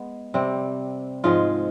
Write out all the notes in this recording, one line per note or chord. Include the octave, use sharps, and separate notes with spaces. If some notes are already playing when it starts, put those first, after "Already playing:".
Already playing: G#3 B3
C3 G3 C4
G#2 F3 G#3 F4